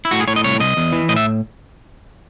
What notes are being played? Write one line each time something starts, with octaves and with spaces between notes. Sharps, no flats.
E4
A2 F#4
G#4
A2 C#5
D#5
C2 C#5
C2 D#5
E2
E3
A2 D#5
E5